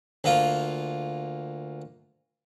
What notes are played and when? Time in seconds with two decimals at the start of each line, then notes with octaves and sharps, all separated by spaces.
0.24 D2 A#3 F4